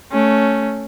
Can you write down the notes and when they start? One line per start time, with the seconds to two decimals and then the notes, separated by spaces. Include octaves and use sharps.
0.12 A3 C#4